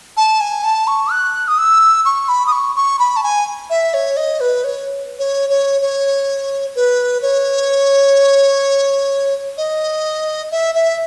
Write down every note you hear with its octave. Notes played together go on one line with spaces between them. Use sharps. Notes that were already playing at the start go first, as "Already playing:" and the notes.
A5
G#5
A5
C#6
F#6
D#6
E6
C#6
B5
D#6
C#6
C#6
B5
A5
G#5
E5
C#5
D#5
B4
C#5
C#5
C#5
C#5
B4
C#5
D#5
E5
E5